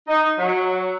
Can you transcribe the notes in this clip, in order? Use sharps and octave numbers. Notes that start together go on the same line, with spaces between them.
D#4
F#3